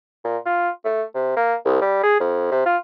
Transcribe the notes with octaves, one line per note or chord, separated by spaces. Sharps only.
A#2
F4
A3
C3
A#3
C2
G3
G#4
F2
C3
F4